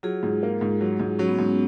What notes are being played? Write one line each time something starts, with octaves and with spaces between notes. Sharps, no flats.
F#3 F4 G#4
G#2
A#3
G#2
F#3
G#2
F#3 C#4
B3
G#2 C#4